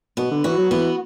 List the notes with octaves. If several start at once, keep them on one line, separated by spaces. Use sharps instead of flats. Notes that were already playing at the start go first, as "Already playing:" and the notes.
B2 B3
D3
E3 F#4
F#3
E3 B3